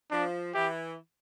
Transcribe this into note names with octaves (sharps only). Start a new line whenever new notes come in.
F3 D4
E3 G4